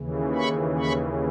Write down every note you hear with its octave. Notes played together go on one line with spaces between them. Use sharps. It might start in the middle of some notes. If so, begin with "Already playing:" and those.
Already playing: D#2 C#3 E3
B5 C#6
B5 C#6